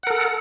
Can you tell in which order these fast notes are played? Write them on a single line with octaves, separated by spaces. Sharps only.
F#5 A#4 A4